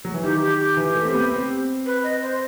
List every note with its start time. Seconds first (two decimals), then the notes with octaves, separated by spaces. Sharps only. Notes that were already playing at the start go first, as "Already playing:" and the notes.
0.05 F#3
0.14 E3
0.23 D#3 G4
0.41 G4
0.59 G4
0.77 E3
0.95 A3
1.05 C4
1.13 B3
1.31 C4
1.86 B4
2.03 D#5
2.22 C5